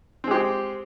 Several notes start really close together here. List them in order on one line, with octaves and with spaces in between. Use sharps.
C4 G#3 G4